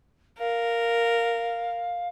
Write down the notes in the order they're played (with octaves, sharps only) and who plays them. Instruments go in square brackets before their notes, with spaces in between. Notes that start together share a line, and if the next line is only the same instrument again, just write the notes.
[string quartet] A#4 [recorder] F5